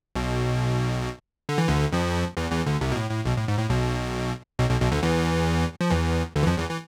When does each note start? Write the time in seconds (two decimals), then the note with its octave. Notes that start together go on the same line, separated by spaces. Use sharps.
0.15 B1 B2
1.49 D3
1.58 E3
1.68 D2 D3
1.92 F2 F3
2.37 E2 E3
2.51 E2 E3
2.66 D2 D3
2.81 C2 C3
2.92 B2
2.96 A2
3.11 A2
3.26 B1 B2
3.37 A2
3.48 G#2
3.59 A2
3.70 B1 B2
4.59 B1 B2
4.70 B1 B2
4.81 B1 B2
4.92 D2 D3
5.02 E2 E3
5.81 F3
5.91 E2 E3
6.36 D2 D3
6.43 E3
6.47 F2 F3
6.57 E2 E3
6.69 E3